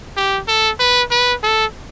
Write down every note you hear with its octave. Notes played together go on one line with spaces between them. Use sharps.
G4
A4
B4
B4
A4